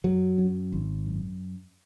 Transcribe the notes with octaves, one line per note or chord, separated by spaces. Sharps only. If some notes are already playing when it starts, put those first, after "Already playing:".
F#2 F#3
F#2
G#1
F#2